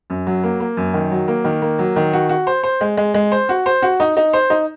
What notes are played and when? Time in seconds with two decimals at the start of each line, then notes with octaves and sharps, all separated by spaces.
0.10 F#2
0.27 F#3
0.43 A#3
0.60 A#3
0.77 F#2
0.94 D#3
1.11 F#3
1.28 A#3
1.44 D#3
1.62 A#3
1.79 F#3
1.96 D#3
2.13 F#4
2.29 F#4
2.47 C5
2.63 C5
2.81 G#3
2.97 G#3
3.14 G#3
3.32 C5
3.49 F#4
3.66 C5
3.82 F#4
4.00 D#4
4.17 D#4
4.33 C5
4.50 D#4